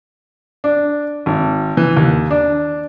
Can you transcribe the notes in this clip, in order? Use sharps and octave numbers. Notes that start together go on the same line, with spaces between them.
D4
G#1
E3
D#2
D4